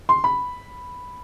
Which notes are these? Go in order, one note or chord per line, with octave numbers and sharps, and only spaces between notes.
C6
B5